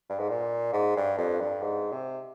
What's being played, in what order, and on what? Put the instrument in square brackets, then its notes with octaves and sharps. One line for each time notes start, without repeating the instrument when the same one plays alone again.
[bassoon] G2
G#2
A#2
G#2
G2
F2
G2
G#2
C3